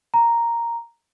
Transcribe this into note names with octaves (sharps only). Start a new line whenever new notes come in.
A#5